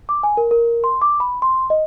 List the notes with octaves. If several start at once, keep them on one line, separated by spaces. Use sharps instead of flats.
D6
G#5
A#4
A#4
C6
D6
B5
C6
D#5